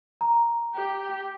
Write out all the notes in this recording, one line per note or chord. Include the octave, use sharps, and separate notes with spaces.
A#5
G4